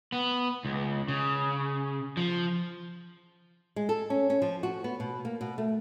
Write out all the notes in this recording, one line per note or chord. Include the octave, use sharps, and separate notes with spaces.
B3
C#2
C#3
F3
G#3
A4
C#4
C#4
F3
F#4
B3
B2
A#3
B2
A3